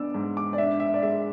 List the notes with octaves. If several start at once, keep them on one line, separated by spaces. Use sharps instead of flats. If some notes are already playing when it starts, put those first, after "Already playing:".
Already playing: B3 D4 D6 E6
G#2
D6
D5
D4 E5
E5
D5
G#3 E5